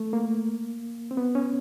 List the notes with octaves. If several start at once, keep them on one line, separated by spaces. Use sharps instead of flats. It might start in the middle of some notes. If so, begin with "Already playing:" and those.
Already playing: A3
A#3
C4
B3
C#4